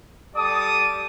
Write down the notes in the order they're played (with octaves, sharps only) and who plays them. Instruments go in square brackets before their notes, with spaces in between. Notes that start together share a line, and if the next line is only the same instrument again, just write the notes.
[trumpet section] G3 A4 D5 A5 D6 D#6